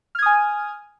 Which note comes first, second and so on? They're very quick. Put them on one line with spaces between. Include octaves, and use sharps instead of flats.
F6 G#6 D#6 G#5